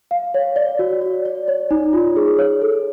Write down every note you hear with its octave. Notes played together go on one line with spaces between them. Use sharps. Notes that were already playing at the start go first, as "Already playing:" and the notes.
F5
C#5
D5
F#4
D5
D5
C#5
D#4
F4
G#4
C#5
A4